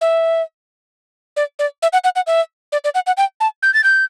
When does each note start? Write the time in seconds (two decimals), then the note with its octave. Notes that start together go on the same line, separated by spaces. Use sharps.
0.01 E5
1.36 D5
1.59 D5
1.82 E5
1.93 F#5
2.04 F#5
2.16 F#5
2.27 E5
2.72 D5
2.84 D5
2.95 F#5
3.07 F#5
3.17 G5
3.40 A5
3.63 G6
3.74 A6
3.84 G6